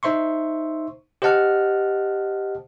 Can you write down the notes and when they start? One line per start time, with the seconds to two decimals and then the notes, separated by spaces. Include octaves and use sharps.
0.03 D#4 C5 E5 C6 C#6
1.22 G4 C5 D#5 F#5 A5 F6